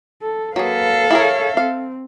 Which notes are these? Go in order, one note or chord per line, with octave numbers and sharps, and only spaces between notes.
A4
F#3 A#3 G#4 A4 B4 F5
E4 G#4 A#4 C#5 E5
C4 F5